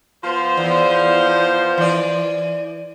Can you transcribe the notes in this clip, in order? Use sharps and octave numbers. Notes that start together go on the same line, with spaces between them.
F3 B3 C5
E2
E3 D5